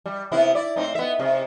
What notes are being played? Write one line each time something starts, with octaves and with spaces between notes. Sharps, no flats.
G3
C3 B3 E4
E4 D5
A2 C4 D#4
B3 E5
C3